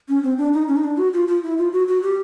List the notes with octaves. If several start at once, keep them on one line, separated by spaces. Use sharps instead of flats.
C#4
C4
D4
D#4
C#4
D#4
D4
F#4
F4
F4
E4
F4
F#4
F#4
G4